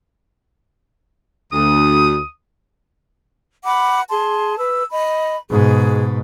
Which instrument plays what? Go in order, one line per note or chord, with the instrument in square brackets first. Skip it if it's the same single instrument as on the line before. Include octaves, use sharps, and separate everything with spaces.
[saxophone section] D2 [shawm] D#6
[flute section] F#5 B5 D6
G#4 A5 C6
B4 E6
D#5 B5
[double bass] G#2 B2 [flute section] G#4